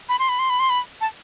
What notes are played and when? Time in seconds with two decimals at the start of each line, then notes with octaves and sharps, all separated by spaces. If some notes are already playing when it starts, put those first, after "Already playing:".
0.09 B5
0.19 C6
0.29 B5
0.39 C6
0.50 B5
0.60 C6
0.70 B5
1.01 A5